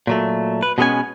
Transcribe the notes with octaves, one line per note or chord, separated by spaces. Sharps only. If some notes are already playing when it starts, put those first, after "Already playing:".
A#2 F#3 A3
B4
B2 F3 G#3 B3 C#4 G#5